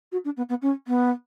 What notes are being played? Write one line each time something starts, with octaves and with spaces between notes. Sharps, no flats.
F#4
D4
B3
B3
C#4
B3